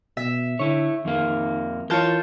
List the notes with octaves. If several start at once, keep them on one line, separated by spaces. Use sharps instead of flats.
B2 E5
D3 E4 C#5
F2 D#3 A#3
E3 F4 A#4 C#5 A5 G6